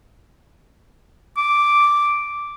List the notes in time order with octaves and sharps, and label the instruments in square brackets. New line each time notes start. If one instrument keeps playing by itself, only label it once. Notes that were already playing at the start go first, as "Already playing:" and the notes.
[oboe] D6